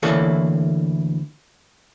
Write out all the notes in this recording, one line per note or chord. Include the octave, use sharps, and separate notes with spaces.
D2 E3 A#3 E4 A4 C#5